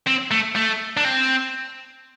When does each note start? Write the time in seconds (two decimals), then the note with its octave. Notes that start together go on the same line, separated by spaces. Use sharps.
0.07 C4
0.31 A3
0.56 A3
0.97 D4
1.05 C4